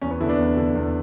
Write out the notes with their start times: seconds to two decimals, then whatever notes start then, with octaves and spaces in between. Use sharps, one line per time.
0.01 E2 C#4
0.11 B3
0.21 D3 E4
0.29 B3 D4
0.39 E2
0.57 D3
0.75 E2